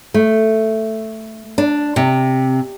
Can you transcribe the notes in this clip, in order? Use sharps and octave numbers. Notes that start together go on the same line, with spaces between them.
A3
D4
C3